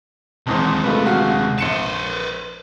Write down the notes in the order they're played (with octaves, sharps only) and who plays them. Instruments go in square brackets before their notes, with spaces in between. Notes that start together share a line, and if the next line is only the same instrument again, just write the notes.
[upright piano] D#1 E2 C5 [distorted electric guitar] C3 G#3
[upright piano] A3 F4 B4
D#1 F#4 F5
[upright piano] A#1 C#7 E7 [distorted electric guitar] B4 C5